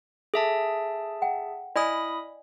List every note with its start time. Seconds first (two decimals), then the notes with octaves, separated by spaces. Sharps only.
0.34 G#4 A4 E5 A5
1.22 F#5 G5
1.76 E4 D5 D#5 G#5 B5 D#6